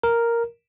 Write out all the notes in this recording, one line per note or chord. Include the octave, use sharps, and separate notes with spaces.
A#4